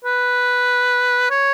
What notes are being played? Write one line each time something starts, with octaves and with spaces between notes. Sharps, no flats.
B4
C#5